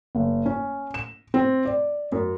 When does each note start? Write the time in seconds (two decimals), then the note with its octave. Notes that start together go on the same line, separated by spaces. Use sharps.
0.15 F#1
0.46 C#4
0.94 E7
1.34 C4
1.65 D5
2.12 F#2